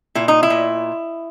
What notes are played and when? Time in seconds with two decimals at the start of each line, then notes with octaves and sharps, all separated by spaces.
0.15 A#2 E4
0.28 D#4
0.43 E4
0.50 A#2